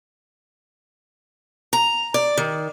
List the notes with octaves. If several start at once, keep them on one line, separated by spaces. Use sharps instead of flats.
A#5
D5
D#3